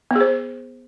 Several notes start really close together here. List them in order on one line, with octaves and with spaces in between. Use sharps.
B3 G#4 C5